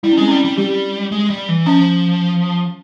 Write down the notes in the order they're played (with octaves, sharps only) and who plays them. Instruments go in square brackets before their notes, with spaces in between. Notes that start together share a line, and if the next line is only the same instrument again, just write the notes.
[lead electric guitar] G3 [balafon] E4
[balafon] C#4
[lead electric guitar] G#3 [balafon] C4
[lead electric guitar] G3 [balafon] C#4
[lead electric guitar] G3
[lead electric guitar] G3 [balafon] G4
[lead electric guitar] G#3
G3
E3
[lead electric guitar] F3 [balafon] C#4